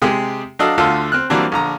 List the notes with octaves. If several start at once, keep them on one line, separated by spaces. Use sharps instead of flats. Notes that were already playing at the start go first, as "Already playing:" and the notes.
C3 G#3 G4 G#4
F#3 D4 A4 D5 D#5 F5
D2 D3 A3 F4 A4 F5
C4 F6 F#6
E3 F#3 G3 A#3 C4 D4
A#1 D3 A#5